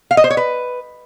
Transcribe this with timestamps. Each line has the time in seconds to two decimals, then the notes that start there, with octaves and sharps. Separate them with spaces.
0.11 F5
0.17 D#5
0.24 C5
0.30 C#5
0.37 B4